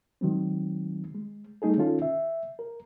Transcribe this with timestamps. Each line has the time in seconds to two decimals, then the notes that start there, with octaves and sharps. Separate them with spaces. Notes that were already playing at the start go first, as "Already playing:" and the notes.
0.21 D#3 F#3 G#3 C4
1.15 G#3
1.62 G3 A3 D#4 G#4 A4
1.77 D#3 C#4 D#4 F4 A4
2.02 E5
2.59 A#4